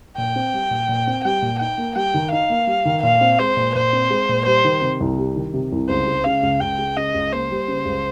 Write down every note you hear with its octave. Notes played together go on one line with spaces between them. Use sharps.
A#2 G5
C4
G3
A#2
A#2
C4
G3 G5
A#2
D#4 G5
A#3
G3 G5
D#3
D#4 F5
A#3
G3
D#3
A#2 F5
C4
G#3 C5
A#2
A#2 C5
C4
G#3
A#2
G3 C5
D#3
C3
C2
G3
D#3
C3
C2
C#2 C5
G#3
C#3 F5
C#2
C#2 G5
G#3
C#3 D#5
C#2
A#3 C5
G3
C#3
C#2